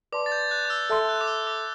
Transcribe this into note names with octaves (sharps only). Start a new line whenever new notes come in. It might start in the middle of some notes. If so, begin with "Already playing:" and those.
B4 D5 A5 C6 D6
A6
G6
F#6
D6
E6
A4 E5 A5 C6 E6
F#6
D6
E6
D6